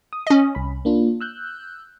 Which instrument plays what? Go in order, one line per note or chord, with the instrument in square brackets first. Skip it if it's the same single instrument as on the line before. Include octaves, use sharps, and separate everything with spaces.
[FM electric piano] D#6
[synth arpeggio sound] C#4 D#5
[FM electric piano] C2 B5
A#3 D4 F4
E6 F#6 G6